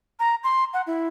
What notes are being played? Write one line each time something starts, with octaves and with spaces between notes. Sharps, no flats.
A#5
C6
F#5
E4